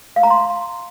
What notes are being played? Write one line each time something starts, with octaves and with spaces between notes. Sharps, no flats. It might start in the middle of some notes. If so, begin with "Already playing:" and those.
F5
A#5
C6